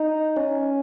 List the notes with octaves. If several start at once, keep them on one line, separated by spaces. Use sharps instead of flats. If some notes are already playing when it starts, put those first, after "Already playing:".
Already playing: D#4
C#4